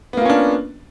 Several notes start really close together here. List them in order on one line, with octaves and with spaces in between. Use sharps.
B3 A#3 F4 C#4 D4